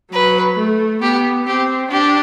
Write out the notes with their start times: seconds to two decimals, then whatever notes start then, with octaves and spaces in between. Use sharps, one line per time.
0.13 F#3 B4
0.57 A3
1.02 B3 G4
1.47 C4 G4
1.91 D4 G4